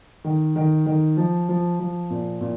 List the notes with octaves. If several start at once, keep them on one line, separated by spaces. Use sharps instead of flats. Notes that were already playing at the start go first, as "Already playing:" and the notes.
D#3
D#3
D#3
F3
F3
F3
A#2
A#2